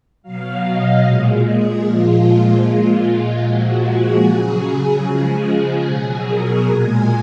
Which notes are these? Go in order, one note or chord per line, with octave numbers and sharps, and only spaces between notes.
B2 F#3 F5
D#5
A#2 G#3
G#4
A#2 F3 G#3 F4
A#2 G#3
A#2 F3 G#3 F#4
G#4
C#3 F#3
C#3 F3 G#3
B2 F#3 G#4
A#4
A#2 G#3 G#5